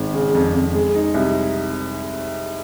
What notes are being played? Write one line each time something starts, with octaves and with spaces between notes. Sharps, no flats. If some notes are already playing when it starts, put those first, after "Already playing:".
Already playing: G#1
C#3
F2
F2
G#3
D#4
C2